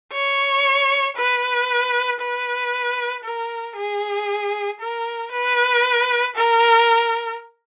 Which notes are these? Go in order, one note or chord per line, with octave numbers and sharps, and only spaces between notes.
C#5
B4
B4
A#4
G#4
A#4
B4
A#4